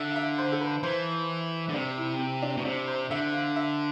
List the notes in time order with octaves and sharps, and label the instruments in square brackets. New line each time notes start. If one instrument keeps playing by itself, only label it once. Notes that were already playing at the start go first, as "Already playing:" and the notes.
Already playing: [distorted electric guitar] D3 [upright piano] E5
[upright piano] F5
E5
C5
A4
B4
[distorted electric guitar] E3 [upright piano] C5
[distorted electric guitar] D3
[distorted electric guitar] C3 [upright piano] D5
[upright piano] E4
C4
D4
[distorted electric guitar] B2
[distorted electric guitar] C3 [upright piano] D4
[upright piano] C5
[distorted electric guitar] D3 [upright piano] E5
[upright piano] F5
E5